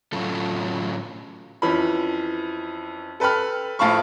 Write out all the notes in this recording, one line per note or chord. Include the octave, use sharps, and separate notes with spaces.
A2 F#3 C#4 F4 A4
F2 E3 C#4 B5
A4 B4 G5 B5 F6
A#1 A2 F5 A5 B5 C#6